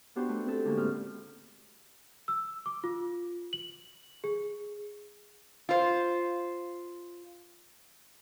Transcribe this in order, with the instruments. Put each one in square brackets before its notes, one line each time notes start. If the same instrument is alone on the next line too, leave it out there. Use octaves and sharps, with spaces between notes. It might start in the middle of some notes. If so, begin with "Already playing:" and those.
[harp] B3 D4 F#4 G4 C5
A3
C4 A4
D3 G#3 A#3 C#4
A2 D4 C5 F6
[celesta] E6
D6
F4
F#7
G#4
[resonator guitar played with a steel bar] F4 C5